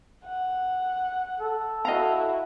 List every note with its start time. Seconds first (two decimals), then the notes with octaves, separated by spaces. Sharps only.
0.24 F#5
1.40 A4
1.85 E4 F#4 D#5 F5 A#5